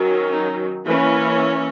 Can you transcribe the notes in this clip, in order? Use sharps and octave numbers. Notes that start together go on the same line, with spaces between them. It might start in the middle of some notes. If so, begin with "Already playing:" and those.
Already playing: D#3 F#3 C#4
D#4
E3 A#3 C#4 B4